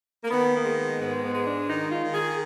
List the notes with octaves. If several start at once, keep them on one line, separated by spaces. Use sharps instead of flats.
A#3
D#3 B3
A#3
G#3
B3
G#2 B3
B3
G#3
D4
D#3 D#4
F4
D#3
G#4